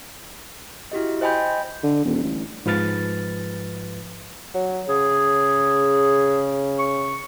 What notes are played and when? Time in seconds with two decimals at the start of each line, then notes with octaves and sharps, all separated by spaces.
0.92 E4 F#4 G4 D#5
1.21 C5 D#5 G5 G#5 B5 G6
1.83 D3
2.05 D#1
2.23 A1
2.66 G#2 F3 B4 F6 A6
4.54 F#3
4.89 C#3 G#4
6.79 C#6